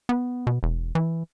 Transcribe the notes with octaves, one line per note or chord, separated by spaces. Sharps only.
B3
B2
E1
E3